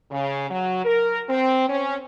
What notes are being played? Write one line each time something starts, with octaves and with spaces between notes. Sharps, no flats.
C#3
F#3
A#4
C4
C#4